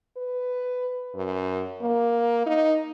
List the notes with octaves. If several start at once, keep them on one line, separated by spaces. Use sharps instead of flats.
B4
F#2
A#3
D#4